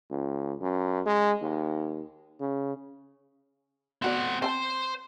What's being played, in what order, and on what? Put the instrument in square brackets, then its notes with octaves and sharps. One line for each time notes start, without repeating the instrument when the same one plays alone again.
[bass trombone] C#2
F#2
G#3
D#2
C#3
[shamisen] B3 F#4 D5 [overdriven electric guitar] C4 F#5
[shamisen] C4 G5 A5 [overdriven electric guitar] C5